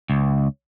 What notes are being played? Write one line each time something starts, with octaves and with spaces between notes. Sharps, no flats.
C#2